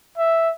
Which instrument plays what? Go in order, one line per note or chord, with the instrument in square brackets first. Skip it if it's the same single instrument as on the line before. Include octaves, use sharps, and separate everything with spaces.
[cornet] E5